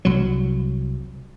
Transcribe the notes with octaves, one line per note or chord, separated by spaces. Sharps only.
C2 F#3